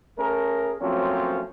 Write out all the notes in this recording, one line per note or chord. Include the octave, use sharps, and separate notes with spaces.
A3 C#4 G#4 A#4
F3 F#3 A3 A#3 C4 C#4